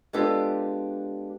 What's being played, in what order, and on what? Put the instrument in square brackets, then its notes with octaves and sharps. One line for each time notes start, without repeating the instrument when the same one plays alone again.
[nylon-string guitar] G#3 B3 D4 F4 G4 A4